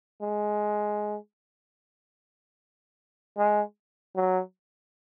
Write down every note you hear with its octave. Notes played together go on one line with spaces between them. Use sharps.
G#3
G#3
F#3